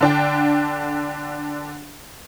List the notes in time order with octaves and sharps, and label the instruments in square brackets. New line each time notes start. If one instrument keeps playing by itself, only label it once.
[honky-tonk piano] D3 D4 G5